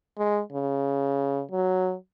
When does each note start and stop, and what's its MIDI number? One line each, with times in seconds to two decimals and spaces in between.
0.18 0.41 56
0.53 1.42 49
1.51 1.95 54